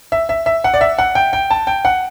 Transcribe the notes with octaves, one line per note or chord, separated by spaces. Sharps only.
E5
E5
E5
F#5
D5
E5
F#5
G5
G5
A5
G5
F#5